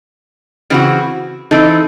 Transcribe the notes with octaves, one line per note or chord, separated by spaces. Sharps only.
C#3 E3 C4 F#4
E3 C4 D#4 A4